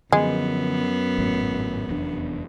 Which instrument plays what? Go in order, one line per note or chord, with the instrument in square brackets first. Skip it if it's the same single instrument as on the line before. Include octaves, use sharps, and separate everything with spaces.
[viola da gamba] F#2 B3 [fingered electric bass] D3 F3 [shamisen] G#3
[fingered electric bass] G#1 A2 F#3
F1 E2 D4